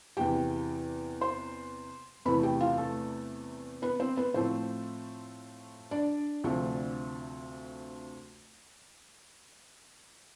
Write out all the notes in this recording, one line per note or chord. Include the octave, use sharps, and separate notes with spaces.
E2 C3 E3 G4 G5
C5 C6
E2 C3 E3 A3 B4 B5
G4 G5
F4 F5
A3 A4
B3 B4
C4 C5
B3 B4
A2 F3 A3 C4 C5
D4 D5
D2 C3 F3 A3